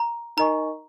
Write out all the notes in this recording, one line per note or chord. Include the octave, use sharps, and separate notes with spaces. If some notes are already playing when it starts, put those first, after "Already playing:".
Already playing: A#5
D#4 A#4 D#5 G#5 A#5 C#6